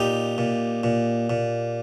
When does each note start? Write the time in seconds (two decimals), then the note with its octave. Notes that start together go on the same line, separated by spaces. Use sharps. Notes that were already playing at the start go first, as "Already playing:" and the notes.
Already playing: A#2 D#4 G4
0.38 A#2
0.83 A#2
1.30 A#2